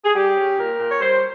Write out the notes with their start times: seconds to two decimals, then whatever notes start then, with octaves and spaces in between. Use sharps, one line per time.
0.05 G#4
0.15 G3 G4
0.37 C#4
0.58 A#2 A#4
0.79 A#2
0.89 C#5
1.01 G3 C5